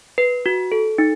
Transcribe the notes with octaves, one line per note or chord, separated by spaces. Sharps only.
B4
F#4
A4
D#4